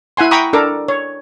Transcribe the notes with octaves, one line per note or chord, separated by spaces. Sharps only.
E4 F#5 G#5 C6
G5 A#5 B5 C#6 D#6
D4 A4 A#4 D6
C#5